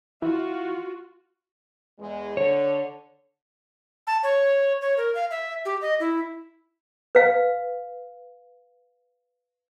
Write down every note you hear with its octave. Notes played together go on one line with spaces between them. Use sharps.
E3 F4 F#4
E2 G#3
D3 C#5
A5
C#5
C#5
A#4
F5
E5
G4
D#5
E4
B4 F5